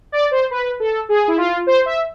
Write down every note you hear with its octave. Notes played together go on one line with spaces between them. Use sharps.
D5
C5
B4
A4
G#4
E4
F4
C5
E5